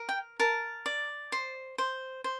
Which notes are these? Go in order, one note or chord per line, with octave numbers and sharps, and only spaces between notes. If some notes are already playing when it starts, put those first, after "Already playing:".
Already playing: A#4
G5
A#4 A5
D5
C5
C5
C5